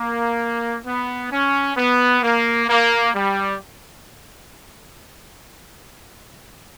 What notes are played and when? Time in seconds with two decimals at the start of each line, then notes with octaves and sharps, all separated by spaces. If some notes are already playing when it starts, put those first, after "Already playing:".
Already playing: A#3
0.86 B3
1.31 C#4
1.77 B3
2.23 A#3
2.68 A#3
3.15 G3